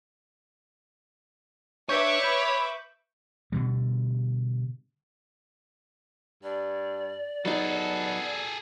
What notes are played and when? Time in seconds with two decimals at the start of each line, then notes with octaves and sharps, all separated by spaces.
1.89 D4 B4 C#5 E5 C#6 D6 G6 C#7
2.23 B5 G6
3.52 B2 D3 G3
6.43 G2 D5
7.45 F#3 B3 D#4 G#4 A4